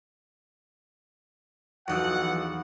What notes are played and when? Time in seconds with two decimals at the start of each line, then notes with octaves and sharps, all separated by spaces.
1.88 B1 E2 F3 D#4 F#5 E6
2.22 B5 F6 C#7